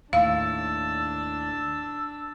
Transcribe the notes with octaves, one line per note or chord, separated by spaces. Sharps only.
D#2 A2 D4 F5 A5 E6